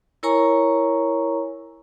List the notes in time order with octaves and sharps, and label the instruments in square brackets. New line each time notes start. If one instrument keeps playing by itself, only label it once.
[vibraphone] E4 A#4 C#5 G#5 A#5 C#6